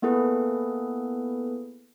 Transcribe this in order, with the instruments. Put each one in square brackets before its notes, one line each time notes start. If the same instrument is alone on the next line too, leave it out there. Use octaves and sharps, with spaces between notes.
[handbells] A#3 B3 E4 G#4 A4 B4